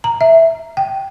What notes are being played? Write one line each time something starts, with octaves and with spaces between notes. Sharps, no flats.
A#5
E5
G5